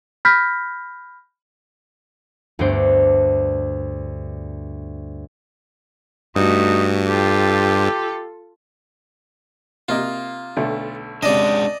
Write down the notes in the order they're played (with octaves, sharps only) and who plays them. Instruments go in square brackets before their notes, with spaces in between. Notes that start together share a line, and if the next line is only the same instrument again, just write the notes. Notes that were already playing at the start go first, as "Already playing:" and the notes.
[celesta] B5 F6 G6 A#6 B6
[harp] D2 G2 B3 D4 C5 D7
[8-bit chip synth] G2 [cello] A3 F#4 [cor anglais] D#4
[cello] F4 A4 [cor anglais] G4
[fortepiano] C3 A#3 D#5 [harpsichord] F4
[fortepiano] B1 D3 A3
[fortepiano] C#2 C3 [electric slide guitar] G#3 D4 [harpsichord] D5 D#5